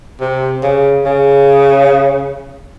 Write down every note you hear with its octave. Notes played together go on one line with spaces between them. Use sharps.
C3
C#3
C#3